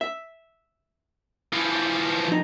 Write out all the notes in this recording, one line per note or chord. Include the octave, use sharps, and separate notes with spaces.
E5
E3 F3
F3 D#4